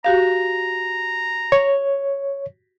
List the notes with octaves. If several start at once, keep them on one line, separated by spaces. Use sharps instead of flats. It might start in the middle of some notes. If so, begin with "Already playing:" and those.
F#4 G4 F5 A#5
C#5